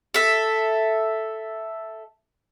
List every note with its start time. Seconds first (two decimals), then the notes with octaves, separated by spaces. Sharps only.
0.14 A4 E5